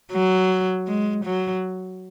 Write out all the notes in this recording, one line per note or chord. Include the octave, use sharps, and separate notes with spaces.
F#3
G#3
F#3